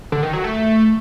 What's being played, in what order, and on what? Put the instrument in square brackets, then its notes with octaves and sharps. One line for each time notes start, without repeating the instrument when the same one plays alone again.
[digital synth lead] D3
D#3
F#3
A3